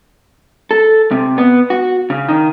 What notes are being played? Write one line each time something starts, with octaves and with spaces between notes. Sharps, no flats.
A4
C3
B3
F#4
C#3
D#3